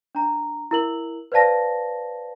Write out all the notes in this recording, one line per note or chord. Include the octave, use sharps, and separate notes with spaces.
D4 A#5
E4 A#4 F#7
B4 C5 D5 F5 A5 A#6